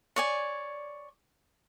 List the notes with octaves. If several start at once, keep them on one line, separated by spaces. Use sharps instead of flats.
C#5 D5 G#5